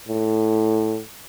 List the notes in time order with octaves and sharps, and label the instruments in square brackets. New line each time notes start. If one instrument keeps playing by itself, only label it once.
[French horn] A2